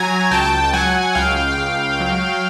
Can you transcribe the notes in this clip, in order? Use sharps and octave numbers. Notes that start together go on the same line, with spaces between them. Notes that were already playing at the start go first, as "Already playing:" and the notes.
Already playing: F#3 G#5 A#5
C#2 G5 A5
G5
F#3 F#5 G#5
C#2 F5 G5
C#2
F#3